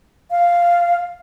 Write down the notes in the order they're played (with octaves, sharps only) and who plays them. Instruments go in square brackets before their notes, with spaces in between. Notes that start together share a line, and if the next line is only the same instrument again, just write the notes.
[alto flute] F5